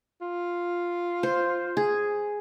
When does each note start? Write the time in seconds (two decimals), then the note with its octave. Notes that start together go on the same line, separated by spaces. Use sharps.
0.21 F4
1.23 C5
1.77 G#4